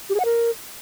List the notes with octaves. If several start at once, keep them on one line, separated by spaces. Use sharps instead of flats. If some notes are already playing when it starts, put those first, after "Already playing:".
G4
G#4
F#5
A#4